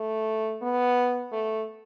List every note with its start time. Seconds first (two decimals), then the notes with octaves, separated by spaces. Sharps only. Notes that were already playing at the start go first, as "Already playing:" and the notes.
Already playing: A3
0.62 B3
1.32 A3